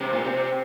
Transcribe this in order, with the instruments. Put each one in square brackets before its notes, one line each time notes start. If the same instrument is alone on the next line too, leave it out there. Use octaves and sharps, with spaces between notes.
[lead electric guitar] C3
A#2
C3